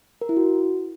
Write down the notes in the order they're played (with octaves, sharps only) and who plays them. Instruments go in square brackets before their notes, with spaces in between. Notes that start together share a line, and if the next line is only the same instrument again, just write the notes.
[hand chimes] A#4
E4
F#4